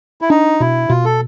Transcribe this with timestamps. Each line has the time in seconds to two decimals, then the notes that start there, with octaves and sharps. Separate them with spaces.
0.21 E4
0.30 D4 D#4
0.60 B2 E4
0.89 B2 F4
1.05 A4